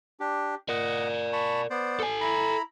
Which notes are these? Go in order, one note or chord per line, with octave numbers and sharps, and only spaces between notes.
D4 G4
A#4 D5 D#5 F#5
A5 B5 C#6
B3 C5 D5
A4 G#5
E4 A#5 B5